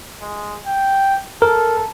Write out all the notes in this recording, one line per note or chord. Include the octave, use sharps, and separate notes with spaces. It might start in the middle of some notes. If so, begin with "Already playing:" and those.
G#3
G5
A4 A#4